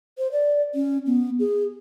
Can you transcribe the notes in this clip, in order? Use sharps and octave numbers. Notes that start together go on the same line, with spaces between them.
C5
D5
C#4
B3
G#4